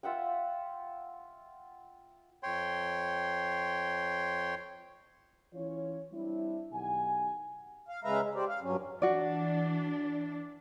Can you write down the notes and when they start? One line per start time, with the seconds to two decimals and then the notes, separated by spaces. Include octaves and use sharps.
0.03 F4 E5 F#5 G5
2.43 F2 C#5 G5 C6
5.54 E3 C#4 F4 C#5
6.12 G3 C4 D4 E4
6.72 B1 D#3 G4 F#5 G#5
7.89 F5
8.04 C#3 G#3 B4 E5 F5 A#5
8.21 G#3
8.35 G4 C5 D5
8.48 F5
8.62 G2 F#3 C#4
9.02 E3 D4 F#4 D5